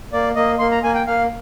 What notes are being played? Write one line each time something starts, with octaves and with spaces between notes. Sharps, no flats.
A#3 D5
A#3 D#5
A#3 C6
A#5
A#3 G#5
G5
A#3 F5